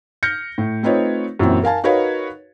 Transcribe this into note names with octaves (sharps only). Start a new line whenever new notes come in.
F6 G6 A#6 C#7
A2
A3 C4 D#4 F4 B4 C#5
F#2 A#2 E3 C4
A#4 F5 G#5 A5
D#4 F#4 A#4 B4 C#5 F5